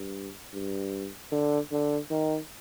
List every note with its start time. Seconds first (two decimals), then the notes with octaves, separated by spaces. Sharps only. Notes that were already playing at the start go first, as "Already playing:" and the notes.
Already playing: G2
0.53 G2
1.32 D3
1.72 D3
2.10 D#3